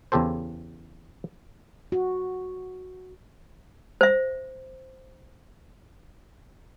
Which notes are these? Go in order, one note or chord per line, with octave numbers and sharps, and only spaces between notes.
E2 C#3 G4 A4 C5
F#4
C5 E5